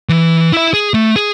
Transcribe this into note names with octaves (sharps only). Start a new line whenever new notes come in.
E3
E4 E5
G#4
A3
G#4